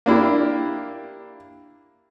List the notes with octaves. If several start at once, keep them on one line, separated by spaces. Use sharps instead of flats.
A#3 D4 E4 G4